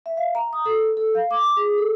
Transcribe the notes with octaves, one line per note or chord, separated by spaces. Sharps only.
E5
F5
A#5
D#6
A4
A4
F5
D6
G#4
A4